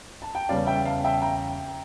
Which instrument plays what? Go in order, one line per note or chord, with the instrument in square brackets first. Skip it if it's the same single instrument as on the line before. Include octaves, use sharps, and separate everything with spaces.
[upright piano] A5
G5
[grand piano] E2 C#3 G3 C#4 [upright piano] D5 F5
[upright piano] E5 G5
F5 A5
E5 G5
G5 A#5